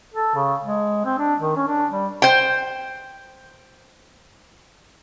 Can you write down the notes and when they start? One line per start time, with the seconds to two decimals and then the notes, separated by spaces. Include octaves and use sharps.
0.14 A4
0.35 C#3
0.64 G#3
1.05 C4
1.18 D4
1.40 D#3
1.56 C#4
1.68 D4
1.91 G3
2.22 C5 G5